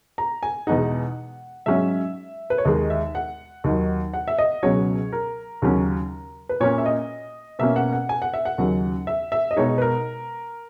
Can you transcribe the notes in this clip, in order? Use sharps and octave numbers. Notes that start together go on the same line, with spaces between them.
A#5
G#5
E2 B2 G#3 D#4 F#5
G#2 F#3 C#4 E5
B4
C#5
D#2 D#3 G#3 D#5
E5
F#5
D#2 D#3 F#3
F#5
E5
D#5
C#2 B2 F#3 C#4 C#5
A#4
D#2 C#3 F#3 C#4
B4
A#2 A#3 C#4 C#5
E5
D#5
B2 A#3 C#4 E5
F#5
F#5
G#5
F#5
E5
F#5
D#2 C#3 F#3 C#4
E5
E5
D#5
B2 G#3 D#4 C#5
B4
A#4